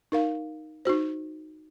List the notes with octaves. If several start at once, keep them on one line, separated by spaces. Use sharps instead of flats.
D#4 A#4 F5
D#4 F#4 C5